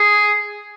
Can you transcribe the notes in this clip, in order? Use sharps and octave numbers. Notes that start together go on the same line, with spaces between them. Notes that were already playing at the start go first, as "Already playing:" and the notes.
Already playing: G#4